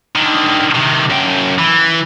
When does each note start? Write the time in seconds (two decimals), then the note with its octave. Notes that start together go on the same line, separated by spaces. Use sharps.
0.16 D3 D#3
0.75 C3 D#3
1.10 F#2 G5
1.59 E3